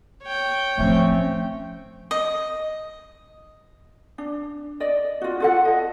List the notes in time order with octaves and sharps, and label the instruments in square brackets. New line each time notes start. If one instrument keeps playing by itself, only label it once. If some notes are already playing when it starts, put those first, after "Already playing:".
[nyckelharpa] C#5 G5
[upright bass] A2 F3 [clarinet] A3 [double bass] C4 C#4
[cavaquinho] D#5
[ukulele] D4
D5 D#5
F4 F#4
F4 A4 F#5
D#5 A5